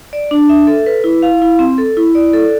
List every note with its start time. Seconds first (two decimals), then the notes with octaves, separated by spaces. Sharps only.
0.13 D5
0.31 D4
0.49 E5
0.67 A4
0.86 B4
1.04 E4
1.23 F5
1.42 E4
1.59 C4
1.78 A4
1.97 E4
2.15 D5
2.33 A4